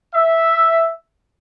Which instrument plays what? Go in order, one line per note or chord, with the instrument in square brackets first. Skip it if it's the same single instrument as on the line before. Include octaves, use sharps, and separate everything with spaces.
[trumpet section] E5